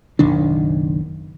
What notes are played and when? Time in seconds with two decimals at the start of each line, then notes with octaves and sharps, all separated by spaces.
0.19 F#1 B1 D#3 D4